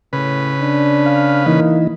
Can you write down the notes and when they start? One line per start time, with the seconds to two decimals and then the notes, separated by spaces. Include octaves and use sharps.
0.13 A2 C#3 B4
0.60 D4
1.06 F5
1.46 E3 A#3 D#4